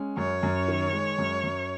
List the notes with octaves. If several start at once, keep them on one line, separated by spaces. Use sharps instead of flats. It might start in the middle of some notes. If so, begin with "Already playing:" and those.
Already playing: G#3 C#4
F#2 C#5
F#2
D#3
G#3
F#2
F#2